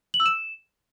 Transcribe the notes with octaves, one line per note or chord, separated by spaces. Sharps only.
F#7
E6
E7